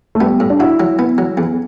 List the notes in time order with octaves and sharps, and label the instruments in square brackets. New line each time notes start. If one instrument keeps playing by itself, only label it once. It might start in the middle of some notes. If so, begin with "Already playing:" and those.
[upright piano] A3
[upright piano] G3 [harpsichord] B3
[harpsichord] A2
[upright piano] D4
[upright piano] E4 [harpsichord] F#4
[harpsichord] F#3
B3
F#3
E2